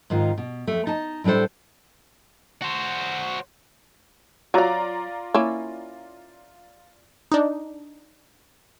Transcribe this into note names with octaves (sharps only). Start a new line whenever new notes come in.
G#2 D#3 F4
B2
F2 A3
D#4 A5
A2 G3 D4 A4 C5
F#4 C5
F#3 F4 D5 F5 A#5
A#3 C#4 E4
D4 D#4